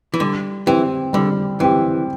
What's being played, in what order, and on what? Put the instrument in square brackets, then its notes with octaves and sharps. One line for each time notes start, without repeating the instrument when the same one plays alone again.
[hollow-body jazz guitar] E3
[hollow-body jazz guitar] D3 [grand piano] G3
[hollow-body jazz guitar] E3 [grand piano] C4 G4
[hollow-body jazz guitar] D3 [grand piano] G3
[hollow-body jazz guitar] E3 [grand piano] C4 G4